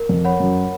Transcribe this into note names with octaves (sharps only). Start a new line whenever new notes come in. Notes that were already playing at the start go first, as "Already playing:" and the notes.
Already playing: A#4
F2
C#5 F#5 B5
F#2